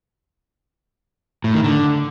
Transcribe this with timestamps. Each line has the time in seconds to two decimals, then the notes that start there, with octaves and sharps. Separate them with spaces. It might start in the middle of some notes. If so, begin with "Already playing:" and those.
1.44 A2
1.54 D#3
1.64 D3